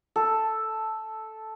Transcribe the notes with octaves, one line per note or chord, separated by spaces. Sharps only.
A4